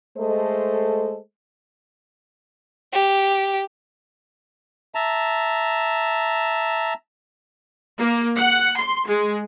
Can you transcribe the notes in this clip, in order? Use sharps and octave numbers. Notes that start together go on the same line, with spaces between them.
G#3 A3 A4 C5 D#5
G4
E5 A5 A#5
A#3
F#5
C6
G#3